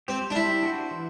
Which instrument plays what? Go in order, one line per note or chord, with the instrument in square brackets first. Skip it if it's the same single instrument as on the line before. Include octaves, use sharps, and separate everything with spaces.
[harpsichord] C4 [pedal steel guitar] G4 C5
[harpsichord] D4
[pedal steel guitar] G3 [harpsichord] E4
[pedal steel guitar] D4 F#4 C5
E3